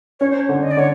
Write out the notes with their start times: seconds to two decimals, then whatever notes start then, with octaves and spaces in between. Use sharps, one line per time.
0.20 C#4 C#5
0.31 C5
0.41 C#5
0.49 D3
0.63 D#5
0.71 D5
0.77 D3 C#5